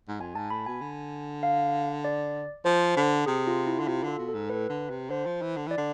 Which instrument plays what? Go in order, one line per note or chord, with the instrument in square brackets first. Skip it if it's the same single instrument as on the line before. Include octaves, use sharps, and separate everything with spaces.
[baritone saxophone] G#2
[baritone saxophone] F2 [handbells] G#5
[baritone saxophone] G#2 [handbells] A5
[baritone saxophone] A2 [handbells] B5
[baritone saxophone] B2 [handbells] G#5
[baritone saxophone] D3
[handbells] F5
D5
[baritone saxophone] F3 [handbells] C5
[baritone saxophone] D3
[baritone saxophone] C3 [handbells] G#4
[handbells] F4
E4
[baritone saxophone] D3
[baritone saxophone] C3 [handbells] F4
[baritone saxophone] D3 [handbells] A4
[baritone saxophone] B2
[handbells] A4
[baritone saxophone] G#2
[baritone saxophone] A2 [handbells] B4
[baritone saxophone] D3
C3
[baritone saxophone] D3 [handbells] C5
[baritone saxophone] F3
E3
D3
[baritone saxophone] E3 [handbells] D5
[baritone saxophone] D3